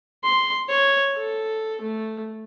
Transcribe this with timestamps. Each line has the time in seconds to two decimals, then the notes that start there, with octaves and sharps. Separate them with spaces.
0.24 C6
0.69 C#5
1.17 A4
1.81 A3